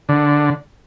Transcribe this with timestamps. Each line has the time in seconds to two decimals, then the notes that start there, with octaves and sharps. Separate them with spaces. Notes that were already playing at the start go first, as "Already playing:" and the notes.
0.09 D3